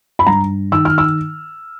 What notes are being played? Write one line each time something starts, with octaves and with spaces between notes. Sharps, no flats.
B5
G2 A#5
D#3 E6
F6
E6